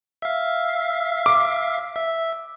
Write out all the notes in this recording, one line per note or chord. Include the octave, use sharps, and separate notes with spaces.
E5 F5
D6
E5